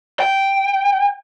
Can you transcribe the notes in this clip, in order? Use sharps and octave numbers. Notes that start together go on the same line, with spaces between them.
G5